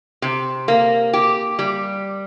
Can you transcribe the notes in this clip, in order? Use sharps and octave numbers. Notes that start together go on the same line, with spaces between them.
C3
A#3
G4
G3